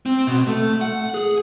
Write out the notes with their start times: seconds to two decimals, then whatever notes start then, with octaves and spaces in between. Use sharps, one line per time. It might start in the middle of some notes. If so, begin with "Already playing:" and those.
0.06 C4
0.27 B2
0.47 A3
0.81 F#5
1.14 G#4